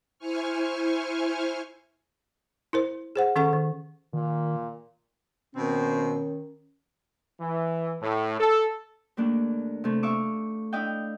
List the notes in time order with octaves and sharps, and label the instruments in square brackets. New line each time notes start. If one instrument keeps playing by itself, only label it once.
[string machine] E4 C5 G#5 C#6 F6
[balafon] E4 A#4 C5
G#4 C5 F#5
D#3 C#4 A4 F#5 C#6
D#3
[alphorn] A#2 [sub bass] D#3
[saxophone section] B2 C4 [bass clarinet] D#3 [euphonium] C#4
[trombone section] E3
A2
A4
[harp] D#2 A3 A#3 D4
C3 A3
E5 F5 C#6 D6 E6
D4 E4 D#5 F5 G5